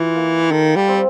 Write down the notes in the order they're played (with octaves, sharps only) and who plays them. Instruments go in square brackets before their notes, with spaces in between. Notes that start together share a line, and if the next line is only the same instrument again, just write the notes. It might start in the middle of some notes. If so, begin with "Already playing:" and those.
Already playing: [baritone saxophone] E3 [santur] F4
[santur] A#3
[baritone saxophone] D#3 [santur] A4
[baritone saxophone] G3
[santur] C4